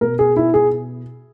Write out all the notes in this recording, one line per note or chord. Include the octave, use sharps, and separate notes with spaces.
B2 A#4
G#4
E4
G#4